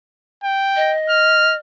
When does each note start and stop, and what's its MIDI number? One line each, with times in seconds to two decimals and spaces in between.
0.44 0.95 79
0.76 1.56 75
1.09 1.56 89